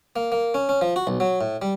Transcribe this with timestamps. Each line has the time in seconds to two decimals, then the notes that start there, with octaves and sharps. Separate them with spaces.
0.16 A#3
0.32 A#3
0.54 C#4
0.69 C#4
0.81 F3
0.96 F#4
1.07 B1
1.20 F#3
1.41 A2
1.62 G3